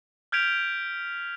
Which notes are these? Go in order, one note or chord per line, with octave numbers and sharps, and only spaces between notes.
F6 G6 G#6 B6 D7 F7